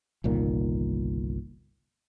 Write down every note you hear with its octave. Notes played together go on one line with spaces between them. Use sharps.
G1 C2 A#2 D#3